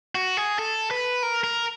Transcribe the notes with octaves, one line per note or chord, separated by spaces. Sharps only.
F#4
G#4
A4
B4
A#4
A#4